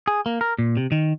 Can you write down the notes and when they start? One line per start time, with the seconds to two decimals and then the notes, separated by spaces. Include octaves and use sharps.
0.08 G#4
0.26 A#3
0.41 A#4
0.59 A#2
0.77 C3
0.92 D#3